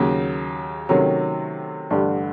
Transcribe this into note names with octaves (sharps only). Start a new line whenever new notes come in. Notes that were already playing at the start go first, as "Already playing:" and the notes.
Already playing: D#2 C#3 F#3
C3 D#3 F#3 A3 C#4
A1 G2 D3 G3